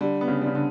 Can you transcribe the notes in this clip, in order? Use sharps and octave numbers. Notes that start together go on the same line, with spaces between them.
D3 G3
B3
C#3
G3
C#3
D3